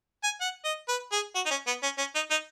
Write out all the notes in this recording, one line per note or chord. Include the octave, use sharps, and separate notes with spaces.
G#5
F#5
D#5
B4
G#4
F#4
D#4
C#4
B3
C#4
C#4
D#4
D#4